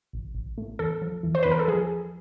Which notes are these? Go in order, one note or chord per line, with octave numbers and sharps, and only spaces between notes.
A1
A1
A2
E2 A4
F3
E2
C5
E2 B4
A#4
A4
F3 G#4